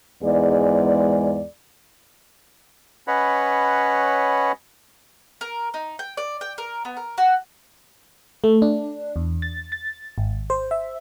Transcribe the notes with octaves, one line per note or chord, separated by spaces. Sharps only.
E2 G#2 G#3 D5
C#4 B4 C#5 D#5 F#5 B5
A#4
D#4
G5
D5
G5
A#4
B3
A#4
F#4
A3
D4
E2
A6
A6
G#1
C5
E5